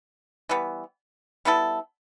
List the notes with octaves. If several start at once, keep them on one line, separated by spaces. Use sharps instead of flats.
E3 G3 B3
G3 B3 E4 A4